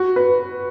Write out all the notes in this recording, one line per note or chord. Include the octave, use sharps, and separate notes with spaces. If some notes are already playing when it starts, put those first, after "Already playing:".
Already playing: F#4
B4